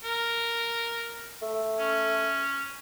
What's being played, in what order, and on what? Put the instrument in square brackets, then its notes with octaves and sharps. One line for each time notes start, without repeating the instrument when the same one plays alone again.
[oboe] A#4
[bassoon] A3
[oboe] C#4